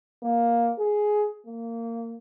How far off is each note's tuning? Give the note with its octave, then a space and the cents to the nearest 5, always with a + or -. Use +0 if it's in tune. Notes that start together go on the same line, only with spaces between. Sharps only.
A#3 +5
G#4 +10
A#3 -20